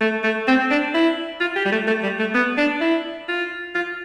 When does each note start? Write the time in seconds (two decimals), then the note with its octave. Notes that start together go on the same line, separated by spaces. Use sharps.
0.01 A3
0.24 A3
0.48 C4
0.71 D4
0.94 E4
1.41 F4
1.56 G4
1.66 G3
1.72 A3
1.87 A3
2.03 G3
2.19 A3
2.34 B3
2.58 D4
2.81 E4
3.28 F4
3.75 F4